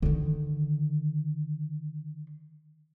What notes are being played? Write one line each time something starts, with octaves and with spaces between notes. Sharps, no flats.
D3 D#3